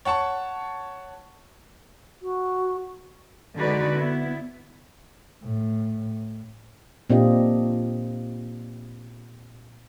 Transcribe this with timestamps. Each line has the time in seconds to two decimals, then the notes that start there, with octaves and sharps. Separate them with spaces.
0.05 C#5 F#5 A5 C#6
2.20 F#4
3.56 D3 G#3 D#4 F#4 B4 D5
3.95 B3 E4
5.43 A2
7.10 A#2 C4 D4 F4 G4 D#5